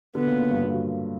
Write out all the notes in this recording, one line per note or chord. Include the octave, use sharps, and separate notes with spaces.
B2 D3 B3
A#2 C#3
A#2 C#3
G2 B2
B2 D3
F#3